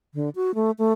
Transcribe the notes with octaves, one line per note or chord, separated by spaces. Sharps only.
D3
F#4
A3
A3